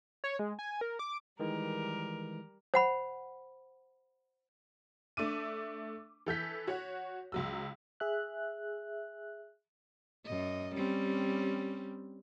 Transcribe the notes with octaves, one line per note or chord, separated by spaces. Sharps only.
C#5
G#3
G#5
A#4
D6
D#3 E3 G3 G#3 A#4
C5 F#5 B5
A3 D4 E5 D6 D#7
E3 A4 G6 B6
F#4 C#5 F#5
C#2 F#3 E6
G#4 E5 F#6
F#2 D#5
G3 C4 C#4